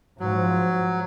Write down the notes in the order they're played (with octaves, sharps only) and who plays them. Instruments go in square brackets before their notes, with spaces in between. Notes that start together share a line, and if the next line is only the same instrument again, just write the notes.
[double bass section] G#2 F3 [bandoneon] F#3